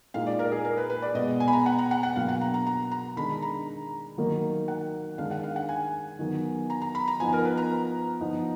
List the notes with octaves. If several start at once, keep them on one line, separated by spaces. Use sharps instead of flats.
A#2 G#3 D#4 F5
D5
A#4
G#4
A#4
B4
B4
D5
B2 G#3 B3 D#5
G#5
B5
A#5
F#5
A#5
F#5
F#5
B2 F#3 A#3 D4 F5
F#5
A#5
A#5
A#5
A#5
D#3 G#3 D4 B5
A#5
D#3 F#3 A#3 D#4
F#5
D#3 G#3 D4 F5
F#5
F5
F#5
G#5
D#3 F#3 B3 D#4
A#5
A#5
B5
A#5
F3 B3 D#4 G#5
A#4
B4
A#5
F3 B3 D#4